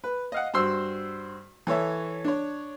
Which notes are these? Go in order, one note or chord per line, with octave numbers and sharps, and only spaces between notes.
B4
D#5 F5 F#5
G2 F#4 C5 C6 E6
E3 A4 C#5 E5
D4 C#5